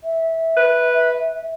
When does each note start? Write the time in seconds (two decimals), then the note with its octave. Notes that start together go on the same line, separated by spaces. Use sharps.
0.04 E5
0.57 B4